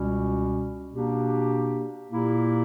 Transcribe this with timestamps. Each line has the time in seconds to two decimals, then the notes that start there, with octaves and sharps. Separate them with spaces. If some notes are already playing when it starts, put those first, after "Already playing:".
Already playing: C#2 B2 G3 C#4 F#4
0.92 B2 A#3 D4 G4
2.07 A#2 A#3 E4 G4